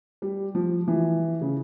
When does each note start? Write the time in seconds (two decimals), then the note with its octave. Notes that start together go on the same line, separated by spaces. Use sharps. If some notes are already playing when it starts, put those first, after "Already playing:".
0.22 G3
0.55 F3
0.88 E3
1.41 C#3